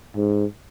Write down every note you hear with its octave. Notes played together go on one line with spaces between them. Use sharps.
G#2